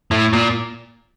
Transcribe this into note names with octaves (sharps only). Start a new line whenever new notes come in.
A2
A#2